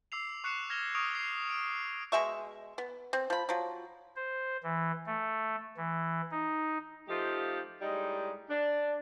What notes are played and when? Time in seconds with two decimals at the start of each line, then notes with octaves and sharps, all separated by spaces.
0.12 D6 E6 C7 F7
0.44 C#6 F#6 C7 C#7 E7
0.70 F6 G#6 A#6 E7 F7 G7
0.95 C#6 D#6 F6 D7 F7
1.15 C7
1.50 D7
2.12 B2 G#3 E5 C#6
2.78 B3
3.13 C4
3.30 F3 B5
3.49 F3 F#3
4.16 C5
4.63 E3
5.06 A3
5.77 E3
6.31 D#4
7.08 F3 A3 D#4 F4 G4
7.81 A2 G3 G#3 D#4
8.49 D4